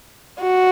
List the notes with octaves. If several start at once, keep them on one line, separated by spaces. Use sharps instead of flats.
F#4